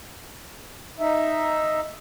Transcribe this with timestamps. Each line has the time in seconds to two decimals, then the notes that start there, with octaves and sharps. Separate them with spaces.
1.00 D#4 E5